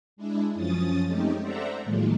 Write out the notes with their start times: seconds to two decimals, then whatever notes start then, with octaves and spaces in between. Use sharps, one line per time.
0.17 G#3 D4 E4
0.55 F#2 F3 C#4 D#6 A6
1.05 G#3 A3 C4 C#4 D#4 G4
1.42 A4 C5 D5 E5 F#5 A#5
1.83 A2 D#3 F3 F#3 G#3 A#3